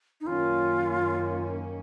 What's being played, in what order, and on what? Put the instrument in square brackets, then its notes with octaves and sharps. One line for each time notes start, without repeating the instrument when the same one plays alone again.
[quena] D#4
[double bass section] F#2 D#3 A#3 C#4 [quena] F4